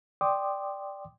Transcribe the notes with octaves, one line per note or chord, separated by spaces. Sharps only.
D5 G5 C6 D6 D#6